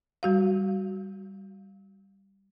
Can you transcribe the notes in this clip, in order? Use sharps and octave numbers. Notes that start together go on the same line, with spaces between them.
G3 F#4 F5